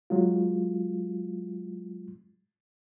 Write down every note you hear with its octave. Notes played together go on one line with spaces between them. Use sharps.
F#3 G#3 F4